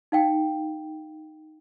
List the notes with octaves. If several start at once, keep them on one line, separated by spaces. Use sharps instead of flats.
D#4 F5 G5